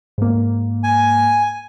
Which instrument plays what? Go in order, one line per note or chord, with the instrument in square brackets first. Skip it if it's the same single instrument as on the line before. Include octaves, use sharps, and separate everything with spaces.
[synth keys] G#2 A#3
[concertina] G#5